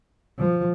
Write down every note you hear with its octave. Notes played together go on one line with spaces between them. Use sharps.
F3